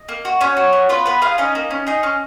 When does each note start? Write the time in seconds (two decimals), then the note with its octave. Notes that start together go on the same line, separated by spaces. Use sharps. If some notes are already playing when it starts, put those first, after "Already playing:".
Already playing: D#5
0.09 A#3
0.25 F#4
0.41 B3 C#4 C#5
0.57 F#4
0.73 B3
0.89 F4 B4
1.06 B3 B4
1.22 F4 G#4 F5
1.38 C#4 D#4 D#5
1.55 A#3
1.71 C#4
1.87 D#4 G#4 D#5
2.03 C#4